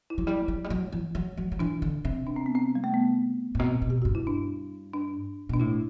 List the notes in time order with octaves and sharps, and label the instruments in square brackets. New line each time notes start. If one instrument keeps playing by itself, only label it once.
[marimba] E4
[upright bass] F#3
[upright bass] G3 [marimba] E4
[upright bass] F#3
G3
F#3
E3
F#3
F#3
F#3
[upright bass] E3 [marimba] D4
[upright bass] D3
C3
[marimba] D4
C4
B3
C4
G3
A3
B3
[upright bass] A2
[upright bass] B2 [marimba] C4
[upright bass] B2
[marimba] G4
[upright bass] G2 [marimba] F#4
[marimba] E4
D4
D4
[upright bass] B2 [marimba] D4
[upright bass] A2 [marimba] E4